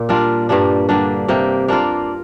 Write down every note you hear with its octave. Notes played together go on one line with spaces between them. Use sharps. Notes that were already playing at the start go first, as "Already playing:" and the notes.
Already playing: A#2 A#3
G3 D4 F4 A#4
G2 G3 A#3 D4
D3 G3 A#3 D4
C3 A#3 G4
A#3 D4 F4 A#4